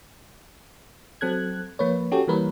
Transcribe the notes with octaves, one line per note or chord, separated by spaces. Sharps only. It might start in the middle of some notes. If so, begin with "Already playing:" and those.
F#3 C4 A4 F#6 G#6
F3 A#3 B4 C#5
C#4 F#4 G4 A4 C#5
E3 G3 A#3 A#4 B4 C#5